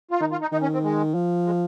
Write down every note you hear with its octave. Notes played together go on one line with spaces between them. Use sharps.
F4
D#3 D#4
F4
D#4
D#3 D#4
C#4
C4
G#3
F3
G#3